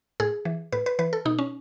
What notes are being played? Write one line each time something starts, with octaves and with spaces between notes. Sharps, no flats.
A2 G#4
E3
A2 B4
B4
E3 B4
A4
B2 D#4
C#4